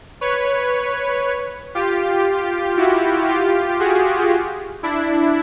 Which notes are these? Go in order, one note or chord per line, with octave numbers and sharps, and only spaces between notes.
B4 C#5
F4 G4
E4 F#4
F4 G4
F#4 G#4
D4 E4